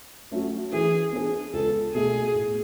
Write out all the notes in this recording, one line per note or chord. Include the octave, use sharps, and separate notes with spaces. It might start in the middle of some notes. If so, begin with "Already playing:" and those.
F#3 A3 C#4
E3 G#4
B3 D4 G#4
C#2 A4
B2 A3 G#4
A2